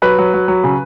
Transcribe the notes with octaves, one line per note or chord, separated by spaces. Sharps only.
F#3 B4
F#3
F#3
F#3
C#3